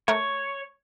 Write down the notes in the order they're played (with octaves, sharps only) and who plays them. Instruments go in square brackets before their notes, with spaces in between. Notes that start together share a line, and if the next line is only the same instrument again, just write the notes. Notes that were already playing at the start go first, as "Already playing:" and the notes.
[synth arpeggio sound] A3 A#4 [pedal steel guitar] C#5